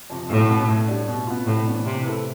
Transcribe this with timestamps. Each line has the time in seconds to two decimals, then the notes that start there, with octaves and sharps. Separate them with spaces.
0.10 F2 C3 F3
0.30 B1 A2
0.49 B2 B3
0.68 A2
0.88 G3 D4
1.08 B2
1.27 B3 F4
1.46 A2 C3
1.66 E3 B3 D4
1.85 C3 E3
2.05 A3 E4 B4